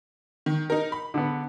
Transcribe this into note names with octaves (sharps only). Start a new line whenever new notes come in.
D#3
D#4 A#4
B5
D3 B3